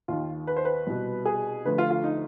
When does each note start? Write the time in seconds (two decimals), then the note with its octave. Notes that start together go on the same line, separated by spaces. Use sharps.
0.08 D#2 D#3 F4
0.47 B4
0.57 C5
0.65 B4
0.87 C2 B2
1.25 G#4
1.65 D2 D3 F3 B4
1.78 F4
1.91 F4
2.04 D#4